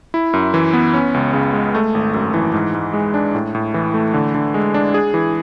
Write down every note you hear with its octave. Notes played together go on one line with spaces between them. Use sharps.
E4
F#2
E3
B3
C#4
C#2
C#3
G#3
A3
G#1
F#2
E3
G#2
G#2
G#3
D4
A2
A2
E3
A3
D3
D3
G#3
D4
G#4
E3